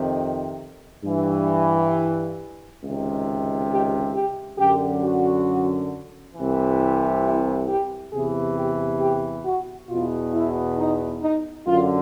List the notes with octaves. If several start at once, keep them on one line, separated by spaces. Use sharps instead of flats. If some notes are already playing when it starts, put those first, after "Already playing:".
Already playing: F2 C3 D#3
G2 E3
C#2 C3 D#3
G4
G4
F#2 D3 G4
F#4
C2 C3 E3
E4
G4
E2 C3 E3 G#4
G4
G4
F#4
E2 B2 F4
E4
D#4
D#4
F#2 D3 F4